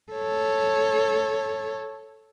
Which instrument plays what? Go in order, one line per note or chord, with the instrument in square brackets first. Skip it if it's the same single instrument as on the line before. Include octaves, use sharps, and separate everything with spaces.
[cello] A4 C#5